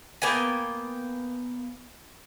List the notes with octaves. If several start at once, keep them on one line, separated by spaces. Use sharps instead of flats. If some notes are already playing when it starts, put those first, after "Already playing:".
A#3 B3 G5 G#5